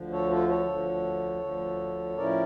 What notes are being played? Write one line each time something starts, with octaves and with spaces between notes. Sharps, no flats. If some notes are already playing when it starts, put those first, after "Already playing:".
Already playing: D2 D3 F3
A4 C#5
F4 A4
A4 C#5
D2 D3 F3
D2 D3 F3
A2 F3 C#4 E4 A#4 D5